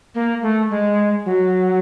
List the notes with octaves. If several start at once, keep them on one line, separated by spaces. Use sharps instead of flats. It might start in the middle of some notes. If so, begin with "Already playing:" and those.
A#3
A3
G#3
F#3